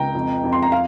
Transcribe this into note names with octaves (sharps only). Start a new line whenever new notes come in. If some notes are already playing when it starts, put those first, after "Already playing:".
Already playing: C#2 G5 A#5
F2
F2
C6
A#5
F5